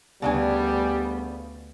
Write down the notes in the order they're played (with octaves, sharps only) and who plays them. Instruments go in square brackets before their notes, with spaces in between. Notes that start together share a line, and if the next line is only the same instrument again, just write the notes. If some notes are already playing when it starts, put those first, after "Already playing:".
[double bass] D2 B3 [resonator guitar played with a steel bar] C#3 D4 G#5 [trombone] G3